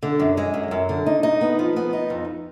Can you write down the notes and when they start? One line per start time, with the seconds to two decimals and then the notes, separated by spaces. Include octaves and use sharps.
0.03 D3
0.20 F#2
0.37 G#3
0.54 F#2
0.71 F#2
0.89 D3
1.06 D#4
1.23 D#4
1.41 B3
1.59 F3
1.76 B3
1.93 D#4
2.10 F2